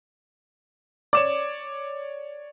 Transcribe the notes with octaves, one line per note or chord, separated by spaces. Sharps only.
C#5 D5 D6 E7